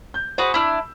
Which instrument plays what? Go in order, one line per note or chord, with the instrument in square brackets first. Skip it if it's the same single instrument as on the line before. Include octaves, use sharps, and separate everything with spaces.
[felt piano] G6
[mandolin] F#4 G#4 B4 [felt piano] C5
[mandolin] D4 E4 [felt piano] B5 E6